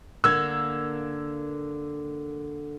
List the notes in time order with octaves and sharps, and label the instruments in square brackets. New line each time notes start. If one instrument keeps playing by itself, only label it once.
[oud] D3 A#3 [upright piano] E6 G#6